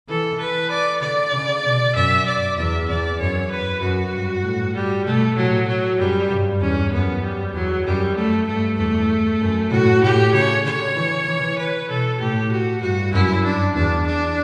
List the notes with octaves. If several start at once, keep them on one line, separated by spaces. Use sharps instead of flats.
E3 A4
B4
D5
D3 D5
C#3
B2
F#2 E5
D5
E2 E5
E2 D5
F#2 C#5
B4
F#2 F#4
G2
A2
G3
B2 A3
A2 F#3
F#3
F#2 G3
G2
E2 C#4
F#2 B3
G3
E2 F#3
F#2 G3
A3
G2 A3
E2 A3
F#2
A2 F#4
A2 G4
C#3 C#5
D3 C#5
E3
E3
B4
B2 A4
A2 G4
F#4
G2 F#4
F#2 E4
D4
E2 D4
D4